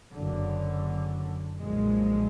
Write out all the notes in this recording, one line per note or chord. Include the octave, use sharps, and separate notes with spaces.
F#1 F#2 D3
B1 A#2 F3 G#3